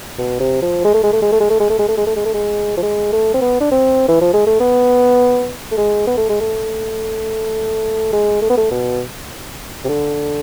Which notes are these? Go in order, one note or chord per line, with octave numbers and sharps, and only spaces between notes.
B2
C3
F3
G#3
A3
G#3
A3
G#3
A3
G#3
A3
G#3
A3
G#3
A3
G#3
A3
G#3
A3
G#3
F3
G#3
A3
C4
B3
D4
C4
E3
F3
G#3
A3
B3
A3
G#3
B3
A3
G#3
A3
G#3
A3
B3
A3
B2
C3
D3